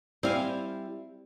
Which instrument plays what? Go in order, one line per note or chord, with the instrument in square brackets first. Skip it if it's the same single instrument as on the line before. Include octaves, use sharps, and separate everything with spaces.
[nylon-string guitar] G3 E4 [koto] C4 F5 G#5